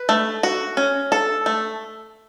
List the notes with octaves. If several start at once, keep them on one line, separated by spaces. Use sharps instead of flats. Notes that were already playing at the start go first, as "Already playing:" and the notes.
Already playing: B4
A3
F#4
C#4
A4
A3